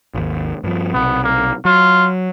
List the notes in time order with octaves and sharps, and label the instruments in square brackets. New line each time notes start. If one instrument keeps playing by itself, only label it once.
[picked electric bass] G#1 D#2
G2 F3
[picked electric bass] B1 C3 [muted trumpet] B3
[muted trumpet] A#3
[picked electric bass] F#3 [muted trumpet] F4